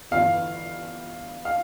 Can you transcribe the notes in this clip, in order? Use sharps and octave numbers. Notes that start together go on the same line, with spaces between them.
G1 G2 E3 F5
F5